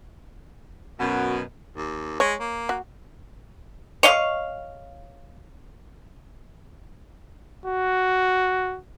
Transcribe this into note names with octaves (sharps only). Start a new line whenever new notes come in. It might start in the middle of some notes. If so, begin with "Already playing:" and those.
F#2 B2 F#4
D#2
G#3 C#5
A#3
F#4
C#5 D#5 F5
F#4